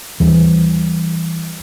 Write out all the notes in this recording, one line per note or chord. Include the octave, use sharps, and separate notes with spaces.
D#2 E3 G3 D4